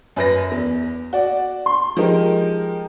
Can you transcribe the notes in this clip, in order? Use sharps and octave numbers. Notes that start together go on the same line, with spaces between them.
F#2 B4 A#6
E2
F#4 D5
C6
F3 G#3 D#4 G4 A#4